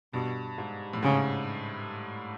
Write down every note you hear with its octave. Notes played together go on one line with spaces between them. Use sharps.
G2 B2
G#2
A2
G#2 C#3